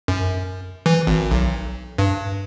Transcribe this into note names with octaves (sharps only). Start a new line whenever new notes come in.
F#2
E3
G#1
B1
G2